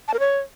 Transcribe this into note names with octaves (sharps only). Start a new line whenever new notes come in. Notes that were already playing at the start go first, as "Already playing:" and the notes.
A5
A#4
C#5